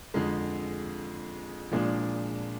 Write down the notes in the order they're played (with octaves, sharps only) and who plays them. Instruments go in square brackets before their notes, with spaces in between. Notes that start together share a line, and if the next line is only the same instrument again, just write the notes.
[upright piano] F2 D3 G#3
A#2 F3 G#3 D4